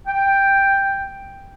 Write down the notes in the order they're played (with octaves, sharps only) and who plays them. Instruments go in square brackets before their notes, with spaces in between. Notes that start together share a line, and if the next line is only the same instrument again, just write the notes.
[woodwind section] G5